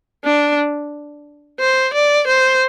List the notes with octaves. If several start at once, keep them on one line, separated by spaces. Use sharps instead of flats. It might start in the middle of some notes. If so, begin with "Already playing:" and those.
D4
C5
D5
C5